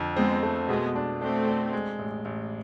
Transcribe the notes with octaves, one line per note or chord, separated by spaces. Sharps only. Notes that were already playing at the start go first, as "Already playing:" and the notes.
Already playing: F2 D3
G#3 B3 C4
A3
B2 G#3 B3
D4
A3 C4 D4
D4
G#3
A1
A1